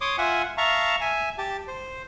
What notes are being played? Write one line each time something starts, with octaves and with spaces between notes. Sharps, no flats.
C#5 C6 D6 D#6
F4 E5 F#5 G#5
E5 F5 A5 A#5 C#6
E5 G#5
G4 A5
C5